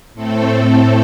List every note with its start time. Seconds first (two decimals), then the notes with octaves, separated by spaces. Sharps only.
0.15 A2 A3 C4 A4